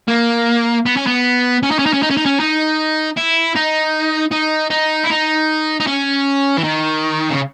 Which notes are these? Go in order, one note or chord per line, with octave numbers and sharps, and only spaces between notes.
A#3
B3
C#4
B3
C#4
D#4
C#4
D#4
C#4
D#4
C#4
D#4
C#4
D#4
E4
D#4
D#4
D#4
E4
D#4
D#4
C#4
E3
D#3
C#3